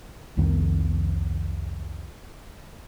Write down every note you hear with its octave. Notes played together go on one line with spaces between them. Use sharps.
C2 F2 D#3